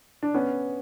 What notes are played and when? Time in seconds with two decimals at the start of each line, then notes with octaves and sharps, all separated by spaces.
0.23 D4
0.34 B3 C#4